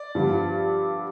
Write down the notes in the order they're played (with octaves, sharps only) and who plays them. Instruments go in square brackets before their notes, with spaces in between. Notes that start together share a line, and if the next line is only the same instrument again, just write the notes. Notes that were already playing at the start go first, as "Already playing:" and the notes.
Already playing: [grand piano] D5
[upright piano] G2 D3 F3